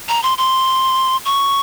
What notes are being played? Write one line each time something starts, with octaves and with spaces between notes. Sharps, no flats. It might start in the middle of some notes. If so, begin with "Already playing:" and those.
A#5
C6
C6
C#6